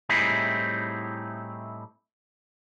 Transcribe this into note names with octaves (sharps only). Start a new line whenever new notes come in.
A2 G3 C4 D#4 E4 G#4